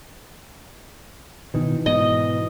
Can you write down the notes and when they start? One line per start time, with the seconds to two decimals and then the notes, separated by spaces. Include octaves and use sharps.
1.54 B2 D#3 E3
1.86 G#2 B2 E3 D#5